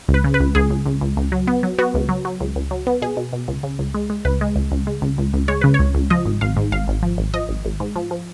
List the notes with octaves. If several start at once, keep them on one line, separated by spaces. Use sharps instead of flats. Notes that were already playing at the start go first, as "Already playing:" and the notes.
C#2
B4
C#3
B4
C#2
C#2 G#4
C#2
C#2
C#2
C#2
F#3
B3
F#3
B3 F#4
C#2
F#3
F#3
C#2
C#2
F#3
B3
B2 G#4
B2
B2
C#2
C#3
C#2
G#3
G#3
C#2 B4
G#3
C#2
C#2
G#3
C#2
C#2
C#2
G#3 C#5
C#3 B4
C#5
C#2
C#2
F3 D#5
G#1
G#1 F5
G#2
G#1 F5
G#1
F3
G#1
F3 D#5
G#1
G#1
G#2
F3
F3